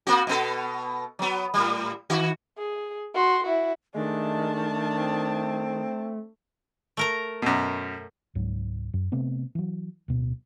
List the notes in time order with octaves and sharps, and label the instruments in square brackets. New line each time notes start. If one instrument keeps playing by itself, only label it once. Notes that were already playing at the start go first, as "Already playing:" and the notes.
[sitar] A#3 C4 F#4
B2 B3 A4
F#3 B3
A2 G3
D#3 F#4
[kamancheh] G#4
F#4 C6
E4 F#4
[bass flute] D#3 [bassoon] G#3 [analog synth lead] A3 [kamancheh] D4 A5
[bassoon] C4
[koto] A3 A#4 A#5
[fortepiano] F#2 B2
[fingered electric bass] C#2 G#2 F#3
F#2
C3 A3 B3 C4
E3 F#3
D1 B2